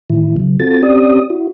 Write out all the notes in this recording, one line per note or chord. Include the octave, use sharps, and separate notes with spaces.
A2 D#3 E3 E4
C#3 F#3
C4 F4 F#4 A4 A6
C4 C#4 G4 D5 D#6
E4 F#4